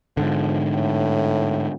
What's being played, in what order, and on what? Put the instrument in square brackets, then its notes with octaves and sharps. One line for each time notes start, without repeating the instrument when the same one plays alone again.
[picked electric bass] G#2 D3 [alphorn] F3
[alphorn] A2